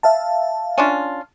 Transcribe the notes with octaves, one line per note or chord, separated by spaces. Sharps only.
E5 F5 A5
C#4 D4 F4